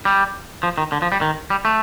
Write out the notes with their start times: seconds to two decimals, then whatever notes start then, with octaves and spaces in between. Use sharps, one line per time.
0.05 G3
0.63 F3
0.78 D#3
0.92 D3
1.02 F3
1.12 G3
1.21 D#3
1.50 G3
1.65 A3